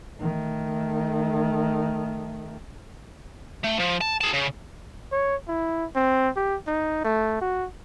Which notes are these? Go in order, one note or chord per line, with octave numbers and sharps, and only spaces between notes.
D#3 A3
A3
F3
A5
G#4 A5
C#3
C#5
E4
C4
G4
D#4
A3
F#4